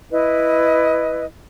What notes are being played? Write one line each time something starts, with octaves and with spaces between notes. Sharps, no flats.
E4 B4 D#5